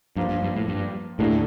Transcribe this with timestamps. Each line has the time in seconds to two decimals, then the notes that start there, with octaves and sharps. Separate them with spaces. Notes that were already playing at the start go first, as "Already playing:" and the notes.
0.16 G2 F3 A#3 F4
0.29 G2
0.43 G2
0.56 A2
0.68 G2
1.19 D#2 A2 D3 A3 D4